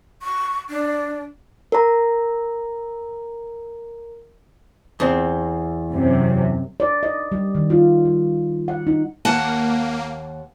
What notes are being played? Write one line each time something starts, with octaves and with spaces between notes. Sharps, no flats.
C#6
D4
A#4 A#5
E2 C4
F#2 C3
D5
D#5
G3
D#3
F4
G3
F#5
D#4
D#2 A#3 F#5 A5